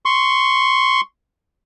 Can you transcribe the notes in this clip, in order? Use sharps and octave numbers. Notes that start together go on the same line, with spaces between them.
C6 C#6